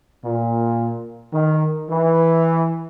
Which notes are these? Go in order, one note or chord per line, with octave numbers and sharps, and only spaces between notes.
A#2
D#3
E3